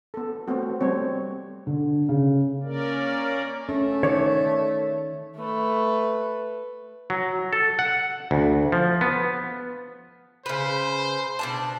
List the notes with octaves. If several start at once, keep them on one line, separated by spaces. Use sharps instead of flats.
B3 A4
A3 B3 C4 F#4
G3 A3 C4 C#5
D3
C#3
A#3 C#4 A#4 D5
A3 C#4
D#3 C#5 D5
A3 B4
F#3
A4
F#5
D2
F3
B3
C#3 B4 C5
B2 D4 A5